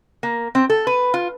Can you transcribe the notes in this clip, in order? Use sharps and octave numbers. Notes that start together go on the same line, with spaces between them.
A#3
C4
A4
B4
F4